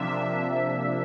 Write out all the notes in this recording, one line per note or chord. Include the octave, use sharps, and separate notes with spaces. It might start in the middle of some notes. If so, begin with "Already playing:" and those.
Already playing: C3 F3 A#3 D4 E5